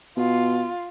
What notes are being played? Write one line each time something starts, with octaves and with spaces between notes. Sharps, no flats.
B2 F4